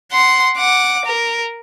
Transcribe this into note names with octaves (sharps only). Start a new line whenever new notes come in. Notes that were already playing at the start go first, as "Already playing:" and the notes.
F#5 C6
F#5 D6
A#4